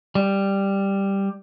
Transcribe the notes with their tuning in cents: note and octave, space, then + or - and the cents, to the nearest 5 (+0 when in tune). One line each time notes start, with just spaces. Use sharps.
G3 +5